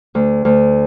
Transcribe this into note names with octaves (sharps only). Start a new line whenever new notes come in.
D2
D2